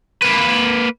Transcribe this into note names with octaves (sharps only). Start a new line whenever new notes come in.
A#3 B4